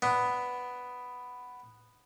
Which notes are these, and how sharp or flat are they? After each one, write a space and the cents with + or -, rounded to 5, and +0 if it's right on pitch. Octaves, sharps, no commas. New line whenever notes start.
B3 +5 D4 +0